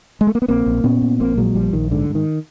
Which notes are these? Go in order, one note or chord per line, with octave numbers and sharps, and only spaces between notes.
G#3
A3
A#3
B3
A#1 A#3 C4
A#1
A#2 B3 C#4
A#2
A#1 A#3 C4
A#2 F#3 G#3
A#1 F3 G3
A#1 D#3
G#2 D3
G#2
D#3